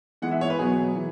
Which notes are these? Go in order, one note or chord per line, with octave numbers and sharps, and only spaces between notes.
E3 G#3 B3 F#5
E5
C#5
B4
B2 F#3 B3 G#4
E3